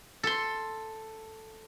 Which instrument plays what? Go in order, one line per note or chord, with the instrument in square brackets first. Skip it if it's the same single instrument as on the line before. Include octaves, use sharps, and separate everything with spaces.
[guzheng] A4 C6